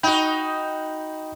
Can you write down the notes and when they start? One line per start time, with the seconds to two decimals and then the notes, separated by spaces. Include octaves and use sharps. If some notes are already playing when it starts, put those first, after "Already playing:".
0.03 D#4 F#4 G5 B5 G6